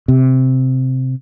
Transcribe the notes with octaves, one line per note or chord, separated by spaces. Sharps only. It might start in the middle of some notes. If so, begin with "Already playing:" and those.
C3